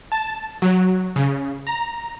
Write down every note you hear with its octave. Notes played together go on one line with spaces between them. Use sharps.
A5
F#3
C#3
A#5